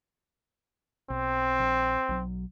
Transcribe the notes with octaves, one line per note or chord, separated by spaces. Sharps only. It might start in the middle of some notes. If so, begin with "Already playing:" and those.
B1 C4
A#1
B1 F#3